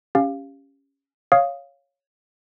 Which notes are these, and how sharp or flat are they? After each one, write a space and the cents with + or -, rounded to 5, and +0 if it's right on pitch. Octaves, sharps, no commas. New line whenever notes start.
C#4 +0 G4 +15 F5 -5
C#5 +0 F5 +0 D#6 +0